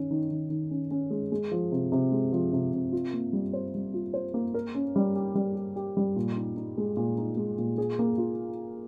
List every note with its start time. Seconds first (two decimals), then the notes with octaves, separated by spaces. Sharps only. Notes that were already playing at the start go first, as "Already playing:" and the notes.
Already playing: D#3 C#4
0.11 D#3
0.31 D#3
0.50 D#3
0.71 C#4
0.91 C#4
1.10 G#3
1.32 G#3
1.52 F3
1.72 C3
1.92 C3
2.12 G#3
2.32 F3
2.53 C3
2.73 C3
2.93 F4
3.13 A#3
3.33 G3
3.53 C5
3.74 G3
3.94 F4
4.14 C5
4.34 A#3
4.54 A#4
4.75 C#4
4.96 G3
5.16 G4
5.35 G3
5.56 G4
5.76 G4
5.97 G3
6.16 A#2
6.37 D#4
6.56 D#4
6.78 G#3
6.97 A#2
7.18 D#4
7.37 G#3
7.58 A#2
7.78 G#4
7.99 A#3
8.18 F4